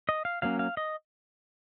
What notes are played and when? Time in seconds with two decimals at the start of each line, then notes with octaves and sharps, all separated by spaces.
0.09 D#5
0.25 F5
0.42 F#3 A#3 C#4 F5
0.59 F5
0.77 D#5